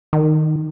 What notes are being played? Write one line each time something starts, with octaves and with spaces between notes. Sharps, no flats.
D#3